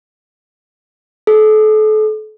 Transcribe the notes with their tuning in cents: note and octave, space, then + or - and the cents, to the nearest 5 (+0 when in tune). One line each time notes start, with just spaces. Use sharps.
A4 -35